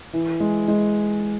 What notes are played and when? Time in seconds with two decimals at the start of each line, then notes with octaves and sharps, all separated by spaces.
0.13 E3
0.40 G#3
0.68 G#3